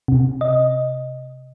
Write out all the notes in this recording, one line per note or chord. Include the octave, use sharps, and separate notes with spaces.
C3
D#5